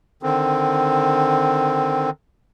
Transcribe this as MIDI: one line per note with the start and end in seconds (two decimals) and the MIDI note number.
0.23 2.10 50
0.23 2.10 51
0.23 2.10 60